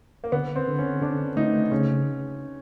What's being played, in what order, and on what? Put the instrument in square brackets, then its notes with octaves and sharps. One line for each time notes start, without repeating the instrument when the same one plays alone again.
[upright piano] A#3
[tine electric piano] D3 [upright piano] B3
[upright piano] C4
[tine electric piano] D3
[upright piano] C#4
[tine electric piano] D3 [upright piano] D4
[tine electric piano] A3 [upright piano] D#4
[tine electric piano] C#3 [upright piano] C#4